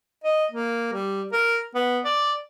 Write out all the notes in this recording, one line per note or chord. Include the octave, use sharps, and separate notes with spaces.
D#5
A#3
G3
A#4
B3
D5